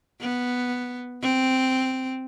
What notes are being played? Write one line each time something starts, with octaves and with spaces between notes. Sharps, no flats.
B3
C4